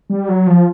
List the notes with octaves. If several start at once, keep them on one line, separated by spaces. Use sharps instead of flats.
G3
F#3
F3